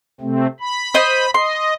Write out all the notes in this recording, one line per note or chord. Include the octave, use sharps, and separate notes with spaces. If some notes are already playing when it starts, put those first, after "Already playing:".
C3 A3 C4
B5
C5 D#5
D#5 C6